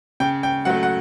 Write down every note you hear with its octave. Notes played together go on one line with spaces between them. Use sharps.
C#3 G5
G5
F#3 A3 F#5
F#5